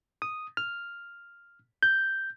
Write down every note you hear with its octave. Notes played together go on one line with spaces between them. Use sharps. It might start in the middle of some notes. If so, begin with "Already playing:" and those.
D#6
F6
G6